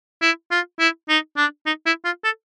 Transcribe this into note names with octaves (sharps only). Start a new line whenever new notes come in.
E4
F4
E4
D#4
D4
D#4
E4
F4
A4